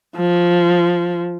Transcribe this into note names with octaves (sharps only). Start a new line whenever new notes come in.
F3